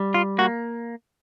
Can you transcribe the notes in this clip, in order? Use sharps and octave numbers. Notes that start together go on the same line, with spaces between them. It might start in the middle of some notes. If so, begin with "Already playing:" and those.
Already playing: G3
F4
A#3 F#4